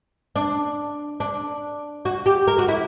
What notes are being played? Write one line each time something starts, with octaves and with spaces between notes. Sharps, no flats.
D4
D4
F#4
G4
A#4
F#4
E4